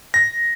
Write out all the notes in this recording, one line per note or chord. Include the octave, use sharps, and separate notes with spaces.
A#6